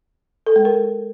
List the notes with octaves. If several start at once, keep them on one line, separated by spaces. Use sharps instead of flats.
A4
G#3
A#4